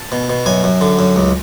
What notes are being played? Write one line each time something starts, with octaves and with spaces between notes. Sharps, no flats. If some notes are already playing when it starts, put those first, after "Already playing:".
Already playing: A5
B2
B2
F#2 G#5
F#2
D3
F#2
C#2